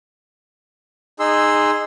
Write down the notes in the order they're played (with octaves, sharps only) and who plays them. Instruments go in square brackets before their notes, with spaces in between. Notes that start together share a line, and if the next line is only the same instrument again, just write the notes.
[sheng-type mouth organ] D#4 G#4 C6 E6